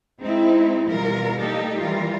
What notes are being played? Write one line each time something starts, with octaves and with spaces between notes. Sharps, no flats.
G#3 C4 D#4 E4
B2 E3 G3 F4 A#4
G3 A#3 D#4 G4 A4
E3 G3 F4 A#4